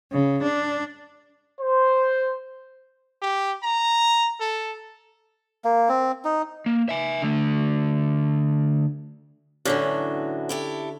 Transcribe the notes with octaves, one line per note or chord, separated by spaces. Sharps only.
C#3
D4
C5
G4
A#5
A4
A#3
C4
D#4
A#3
E5 G#5
D3 A3
A2 D3 E3 F#3 C#4 D4
E4 G4 A4